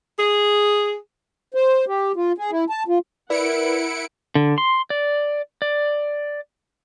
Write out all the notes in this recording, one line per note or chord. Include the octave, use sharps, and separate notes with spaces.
G#4
C5
G4
F4
G#4
E4
A5
F4
E4 A#4 B4 D5 E5 F#5 C#7 D7
D3
C6
D5
D5